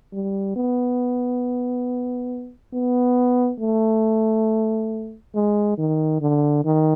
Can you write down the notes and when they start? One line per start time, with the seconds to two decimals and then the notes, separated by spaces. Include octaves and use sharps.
0.13 G3
0.56 B3
2.74 B3
3.60 A3
5.35 G#3
5.78 D#3
6.21 D3
6.65 D#3